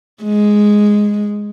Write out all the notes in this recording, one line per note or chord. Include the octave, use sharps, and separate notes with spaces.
G#3